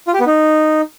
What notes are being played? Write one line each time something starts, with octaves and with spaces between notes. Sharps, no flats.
F4
G4
B3
D#4